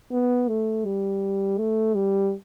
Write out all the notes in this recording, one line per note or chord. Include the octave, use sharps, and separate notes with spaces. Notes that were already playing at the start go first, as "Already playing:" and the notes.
B3
A3
G3
A3
G3